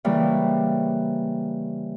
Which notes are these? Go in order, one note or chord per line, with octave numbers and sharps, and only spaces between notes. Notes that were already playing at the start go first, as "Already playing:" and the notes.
C#3 E3 G3 A#3